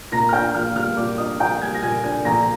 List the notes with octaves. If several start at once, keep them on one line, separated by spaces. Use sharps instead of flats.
A#2 A#5 A#6
F6
D4 G5 G6
A#1 F5 F6
G3 F5 F6
A#2 D5 D6
D4 D#5 D#6
A#1 G5 G6
G3 G#5 G#6
A#6
A#2 G#5 G#6
D4 G#5 G#6
A#1 A#5 A#6